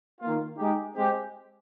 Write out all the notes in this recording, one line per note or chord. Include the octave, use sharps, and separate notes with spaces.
D#3 A#3 F4
G#3 D#4 G4
G#3 C4 G4